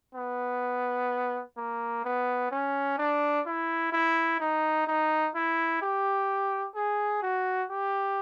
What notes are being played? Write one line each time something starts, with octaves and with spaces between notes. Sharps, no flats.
B3
A#3
B3
C#4
D4
E4
E4
D#4
D#4
E4
G4
G#4
F#4
G4